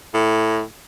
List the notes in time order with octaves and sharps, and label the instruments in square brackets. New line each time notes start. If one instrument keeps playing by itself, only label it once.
[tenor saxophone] A2